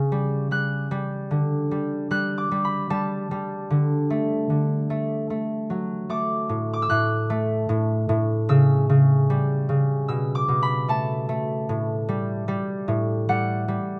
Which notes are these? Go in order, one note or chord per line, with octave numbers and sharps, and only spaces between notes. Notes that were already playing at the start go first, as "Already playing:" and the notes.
Already playing: C#3
G3
G3 F#6
G3
D3
G3
G3 F#6
D6
G3
B5
G3 A5
G3
D3
A3
D3
A3
A3
F#3
A3 D6
A2
D6
E6
A2 F#6
A3
A2
A2
C#3 E6
C#3
G3
C#3
B2 E6
D6
B2
B5
A3 A5
A3
A2
G3
G3
A2
G3 F#5
G3